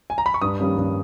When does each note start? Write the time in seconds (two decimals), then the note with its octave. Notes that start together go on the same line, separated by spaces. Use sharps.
0.10 G#5
0.18 A#5
0.26 B5
0.34 C#6
0.42 G2 D#6
0.60 D#3 G3 A#3 C#4
0.78 G2